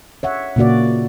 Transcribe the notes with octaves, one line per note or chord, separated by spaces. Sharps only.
C#5 E5 F#5
A#2 C#3 A#3 F#4 D5